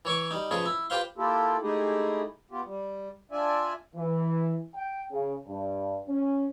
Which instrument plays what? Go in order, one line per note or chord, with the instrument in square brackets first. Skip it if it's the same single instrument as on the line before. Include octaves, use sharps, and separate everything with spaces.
[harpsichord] E3 C#5 C#6 D6
G3 D#4
C#3 F3 G#4 B4
E4
F4 G4 B4 C5 F5 C6
[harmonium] A#3 E4 F4 G4 A4
G#3 A3 D#4 E4 G4 G#4
B3 F4 G4
G3
D4 F4 D5 E5 G#5
[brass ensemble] E3
G5
C#3
G2
C#4